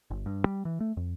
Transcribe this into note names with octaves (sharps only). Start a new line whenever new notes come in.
G1
G2
G3
E3
A3
F2